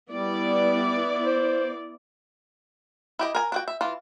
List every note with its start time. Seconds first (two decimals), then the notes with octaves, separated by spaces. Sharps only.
0.11 G3 B3 E4 D5
1.25 C5
3.19 E4 G4 D#5
3.35 A#4 G#5
3.52 D4 F#4 G5
3.68 E5
3.81 E3 F4